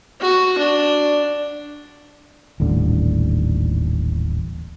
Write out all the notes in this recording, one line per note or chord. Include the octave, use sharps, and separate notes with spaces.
F#4
D4
D#1 A1 D3